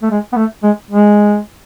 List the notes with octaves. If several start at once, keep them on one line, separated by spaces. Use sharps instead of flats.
A3
G#3
B3
A3
G#3
G#3